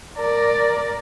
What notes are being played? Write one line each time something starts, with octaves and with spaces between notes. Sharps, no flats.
A#4 D5